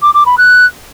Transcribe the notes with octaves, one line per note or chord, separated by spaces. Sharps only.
D6
D6
B5
F#6